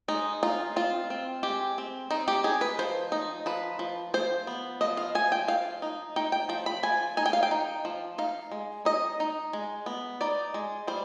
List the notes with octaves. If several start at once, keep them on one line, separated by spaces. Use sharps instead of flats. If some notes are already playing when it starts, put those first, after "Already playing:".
G#3 D#4
D#4 F4
C4 F4
C4
G#3 G4
C4
C4 D#4
G4
D#4 G#4
B4
F3 C5
D#4
F3 B4
F3
F3 C5
B3
F3 D#5
F5
F3 G#5
G5
F3 F5
D#4
D#4 G5
G5
F3 G5
B5
F3 G#5
D#4 G#5
G5
F5
G5
D#4
F3
D#4 F5
G#3
D#4 D#5
D#4
G#3
B3
D#4 D5
G#3
G3 C5